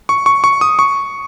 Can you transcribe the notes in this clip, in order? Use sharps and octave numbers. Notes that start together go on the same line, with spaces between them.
C#6
C#6
C#6
D#6
C#6